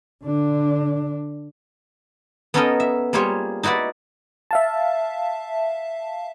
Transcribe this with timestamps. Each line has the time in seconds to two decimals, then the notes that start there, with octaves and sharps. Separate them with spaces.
0.24 D3 D4
2.54 B3 C#4 D#4 A4 A#4 D#5
2.80 E5
3.13 G3 A#3 F4 G#4 C5 C#5
3.63 D#4 E4 F#4 B4 D5
4.51 E5 F5 A5